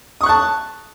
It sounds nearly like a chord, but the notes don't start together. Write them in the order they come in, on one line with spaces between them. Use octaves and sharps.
D#6 C#6 F#6 A5